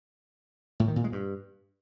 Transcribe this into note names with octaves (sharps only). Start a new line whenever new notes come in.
A2
D#3
A#2
G#3
G2